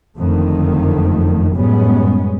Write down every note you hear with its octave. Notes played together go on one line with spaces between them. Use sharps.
F#1 F2 D3 D#3 A3
F#2 A2 G3 G#3 B3 C#4